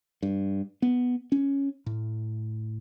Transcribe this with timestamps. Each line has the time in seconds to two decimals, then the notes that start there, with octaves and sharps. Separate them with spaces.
0.23 G2
0.82 B3
1.32 C#4
1.86 A2